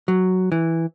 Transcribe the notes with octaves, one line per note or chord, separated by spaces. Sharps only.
F#3
E3